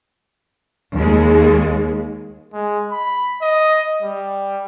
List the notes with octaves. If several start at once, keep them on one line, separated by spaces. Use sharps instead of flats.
D#2 G#3
G#3
B5
D#5
G3